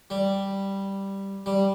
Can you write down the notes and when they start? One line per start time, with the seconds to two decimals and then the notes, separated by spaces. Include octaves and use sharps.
0.10 G3
1.46 G3